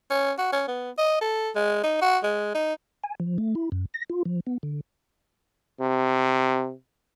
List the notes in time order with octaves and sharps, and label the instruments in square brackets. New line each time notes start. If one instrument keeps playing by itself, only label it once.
[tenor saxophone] C#4
F#4
C#4
B3
D#5
A4
G#3
D#4
F#4
G#3
D#4
[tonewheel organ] G#5
F3
A3
E4
F#2
A#6
F4
F3
B3
D3
[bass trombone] C3